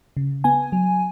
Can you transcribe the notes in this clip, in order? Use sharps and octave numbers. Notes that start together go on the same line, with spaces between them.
C#3
B3 G#5
F#3